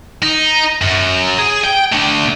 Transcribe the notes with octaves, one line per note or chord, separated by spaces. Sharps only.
D#4
F#2
G#4
G5
A3 D4